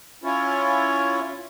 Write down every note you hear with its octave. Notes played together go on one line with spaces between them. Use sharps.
C#4 E4 F4 C#5